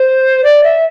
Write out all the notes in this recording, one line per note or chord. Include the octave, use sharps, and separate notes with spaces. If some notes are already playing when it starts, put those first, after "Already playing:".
Already playing: C5
D5
E5